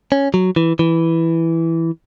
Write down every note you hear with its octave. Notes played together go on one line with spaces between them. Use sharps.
C#4
F#3
E3
E3